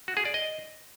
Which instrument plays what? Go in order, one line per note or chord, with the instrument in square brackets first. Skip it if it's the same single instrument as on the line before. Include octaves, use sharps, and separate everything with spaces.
[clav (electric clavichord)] F#4
G#4
D5
D#5